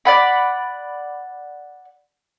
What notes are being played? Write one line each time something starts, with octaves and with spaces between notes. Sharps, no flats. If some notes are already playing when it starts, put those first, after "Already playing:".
D5 F#5 B5